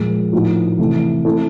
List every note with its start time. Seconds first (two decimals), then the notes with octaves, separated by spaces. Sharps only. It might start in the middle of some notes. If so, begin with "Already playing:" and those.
Already playing: A#2 F3 G#3
0.33 A2 F3 A#3 D#4 F#4
0.79 C3 E3 A3
1.25 A3 C4 E4 A4